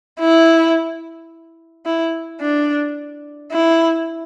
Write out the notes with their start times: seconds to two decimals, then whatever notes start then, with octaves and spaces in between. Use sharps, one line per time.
0.20 E4
1.86 E4
2.41 D4
3.52 E4